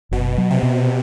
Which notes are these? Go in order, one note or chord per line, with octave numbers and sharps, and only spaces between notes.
F#1 B2
F#3
C3
B2